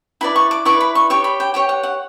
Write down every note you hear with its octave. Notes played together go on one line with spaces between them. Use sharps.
E4 B4 D5 B5
C#6
D6
E4 B4 D5 C#6
B5
C#6
G4 C#5 C#6
B5
G5
G4 C#5 G5
F#5
F#5